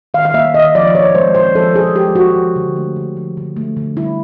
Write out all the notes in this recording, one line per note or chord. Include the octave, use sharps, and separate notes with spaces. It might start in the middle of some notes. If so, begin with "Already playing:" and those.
D#3 F5
F5
A#3 E5
D#3 D#5
F3 D5
A#2 C#5
G#3 C5
A#2 C5
F3 A4
A#2 G#4
G#3 G4
A#2 F#4
F3
D3
A3
D3
F3
D3
A3
D3
G3 E4